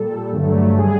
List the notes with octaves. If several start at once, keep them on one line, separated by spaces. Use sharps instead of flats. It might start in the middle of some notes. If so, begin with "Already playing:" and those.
Already playing: A#2 G3 A4
G2 D3 F#3 A3
D3 G3 G#4